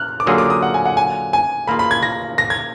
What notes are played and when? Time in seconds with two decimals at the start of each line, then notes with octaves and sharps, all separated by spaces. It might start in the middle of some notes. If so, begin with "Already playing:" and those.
Already playing: F6 F#6
0.20 D6
0.26 D3 F#3 A#3 F4 G#4 D#6
0.38 D6
0.50 D#6
0.62 F#5
0.74 G#5
0.85 F#5
0.97 G#5
1.33 G#5
1.67 D#3 A#3 F4 G#4 B5
1.79 B5
1.91 G#6
2.03 A#6
2.38 A#6
2.50 G#6